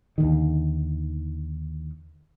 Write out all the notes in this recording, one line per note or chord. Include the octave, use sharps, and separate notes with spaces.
D#2 B2 D3 D#3